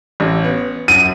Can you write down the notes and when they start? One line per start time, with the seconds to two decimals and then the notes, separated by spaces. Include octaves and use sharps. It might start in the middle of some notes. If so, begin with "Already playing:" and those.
0.20 A1
0.44 B3
0.88 F#2 D#7